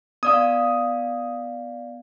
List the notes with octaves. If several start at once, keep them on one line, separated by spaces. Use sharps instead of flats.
B3 D5 F5 D#6